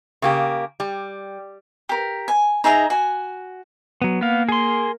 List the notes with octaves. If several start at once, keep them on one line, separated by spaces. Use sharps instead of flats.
C#3 A#3 G4
G3
G4 A#4
G#5
D#4 G#4 E5 A#5
F#4 G#5
F#3 B3
A#3 B3 F5
G#4 C6